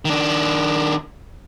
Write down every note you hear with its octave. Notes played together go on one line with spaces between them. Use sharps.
D#3 D4